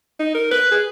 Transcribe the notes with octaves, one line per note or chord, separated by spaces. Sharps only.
D#4
A#4
B4
G#4